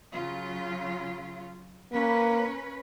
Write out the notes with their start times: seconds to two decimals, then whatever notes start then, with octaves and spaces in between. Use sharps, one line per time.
0.12 C#3 F#3 F4
1.92 A#3 C#4 B4